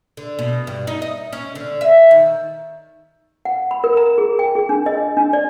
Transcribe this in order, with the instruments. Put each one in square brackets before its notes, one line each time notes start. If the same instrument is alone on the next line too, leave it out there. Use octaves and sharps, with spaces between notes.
[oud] D3
B2
G2
D#4
D#5
C#4
D3
E5
D#3
[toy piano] F#5
B5
A#4
A#5
G#4
G5
G#4
D4
D#5
D4
D5